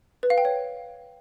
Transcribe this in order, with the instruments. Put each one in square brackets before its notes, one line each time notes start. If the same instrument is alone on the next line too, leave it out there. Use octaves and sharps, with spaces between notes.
[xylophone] B4
F5
G5
C#5